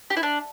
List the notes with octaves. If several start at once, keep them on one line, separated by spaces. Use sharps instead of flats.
G4
E4
D4